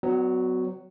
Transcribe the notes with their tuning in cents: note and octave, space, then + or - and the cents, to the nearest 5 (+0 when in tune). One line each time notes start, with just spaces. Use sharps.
F#3 +0 B3 +35 D5 +0